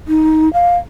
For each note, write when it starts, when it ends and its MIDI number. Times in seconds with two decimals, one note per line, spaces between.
0.08 0.52 63
0.53 0.76 77